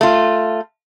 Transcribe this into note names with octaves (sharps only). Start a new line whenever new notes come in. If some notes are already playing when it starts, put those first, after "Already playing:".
A3 F4